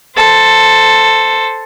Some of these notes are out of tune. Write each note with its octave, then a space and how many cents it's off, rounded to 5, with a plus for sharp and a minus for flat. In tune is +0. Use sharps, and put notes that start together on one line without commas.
A4 +5 C5 +0